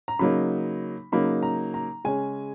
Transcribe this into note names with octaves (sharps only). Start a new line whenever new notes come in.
A#5
C#3 F#3 A#3 D#4 B5
C#3 F#3 A#3 D#4 B5
A#5
A#5
C#3 G#3 C#4 G#5